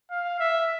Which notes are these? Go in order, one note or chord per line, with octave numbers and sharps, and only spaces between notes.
F5
E5